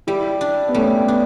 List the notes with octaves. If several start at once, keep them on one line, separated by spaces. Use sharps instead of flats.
G3 E4 G4
D4
B3
G3 A3 C#4
B3 D4